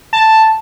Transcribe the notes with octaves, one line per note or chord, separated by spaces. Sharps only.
A5